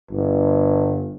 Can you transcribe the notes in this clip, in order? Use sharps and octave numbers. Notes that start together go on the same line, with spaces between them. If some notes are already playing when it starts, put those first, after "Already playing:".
G1